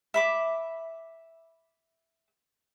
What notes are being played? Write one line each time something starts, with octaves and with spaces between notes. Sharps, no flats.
E5 B5 D6